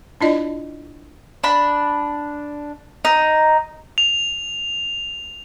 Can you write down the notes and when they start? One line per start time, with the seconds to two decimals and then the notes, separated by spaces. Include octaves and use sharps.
0.21 D4 E4 F4 D5 D#5
1.44 D4 B5
3.05 D#4
3.98 F7